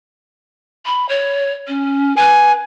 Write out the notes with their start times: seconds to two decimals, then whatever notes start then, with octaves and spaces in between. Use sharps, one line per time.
0.85 B5
1.09 C#5
1.67 C#4
2.17 B4 G#5